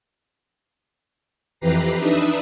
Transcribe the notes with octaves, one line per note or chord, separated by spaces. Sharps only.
F2 E3 G4 B4 A#5 C7
D4 D#4 B4 D#5 E5